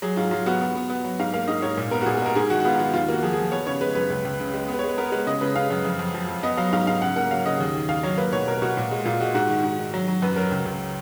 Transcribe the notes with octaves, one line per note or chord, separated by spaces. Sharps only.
F#3 G#4
G#2 F4
F#3 F4
B3 F#4
B3
B3
B3
F#3
G#2 F5
A#3 F5
G#2 D#5
G#2 C#5
A#2
B3 A#4
F#4
A#2 G#4
G#4
G#3 A#4
G#2 G#4
D#3 F#4
F#4
B3 F4
D#3 F4
D#2 F4
A#3 F#4
F3 G#4
G#4
F3
B3 C#5
C#3 C#5
G#3 B4
F#2 B4
C#2
C#2
C#3
G#3
B3
B4
C#5
G#3 B4
B3 A#4
G#3 B4
C#3 D#5
C#3 B4
C#3 F5
F#2
F2
F2
F3
F2
B3 D#5
F#3 F5
G#2 F5
G#2 F5
C#3 F#5
A#3 F#5
F#3 F5
C#3 D#5
D#2
D#3
D#2 F5
F#3 C#5
A#3 B4
B2 C#5
B2 A#4
B2 F#4
A#2
G#3
A#2 F4
G#3 F#4
G#2 F#4
D#3
G#2
D#3
F#3
F#3
F#2 B4
F#3 A#4
C#2
C#2